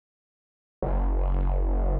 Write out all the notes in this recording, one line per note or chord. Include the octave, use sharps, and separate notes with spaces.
F#1